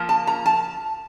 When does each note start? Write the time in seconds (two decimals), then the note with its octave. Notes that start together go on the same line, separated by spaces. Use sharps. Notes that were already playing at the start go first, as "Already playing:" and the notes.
Already playing: F3 A#3
0.09 A5
0.27 A#5
0.46 A5